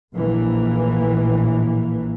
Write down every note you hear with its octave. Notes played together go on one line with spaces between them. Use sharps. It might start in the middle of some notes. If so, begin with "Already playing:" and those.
A#1 A2 E3 A#3